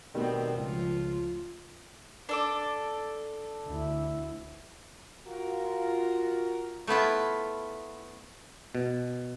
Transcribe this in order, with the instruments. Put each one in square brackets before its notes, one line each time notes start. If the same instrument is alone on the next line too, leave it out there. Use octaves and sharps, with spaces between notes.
[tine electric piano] B2 D#3 G3 [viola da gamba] A3 B3 C4
[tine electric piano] C#2 [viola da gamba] F3 F4
[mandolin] D4 A4 D6
[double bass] D2 E4
[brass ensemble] F4 F#4 A#4
[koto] A3 B3 E4 F4
[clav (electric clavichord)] B2